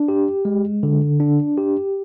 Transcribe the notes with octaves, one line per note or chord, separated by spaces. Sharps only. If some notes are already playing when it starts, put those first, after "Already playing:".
Already playing: D4
G4
G#3
D3
D4
G4